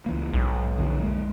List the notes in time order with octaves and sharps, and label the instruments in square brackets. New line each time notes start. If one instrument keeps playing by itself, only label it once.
[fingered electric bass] C#2 E3 A#3
[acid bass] B1 [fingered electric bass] G#2
[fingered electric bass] A1 F2 D3
G#3 A#3